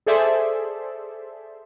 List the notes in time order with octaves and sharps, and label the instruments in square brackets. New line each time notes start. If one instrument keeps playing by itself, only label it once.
[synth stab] G#4 A4 C5 D5 E5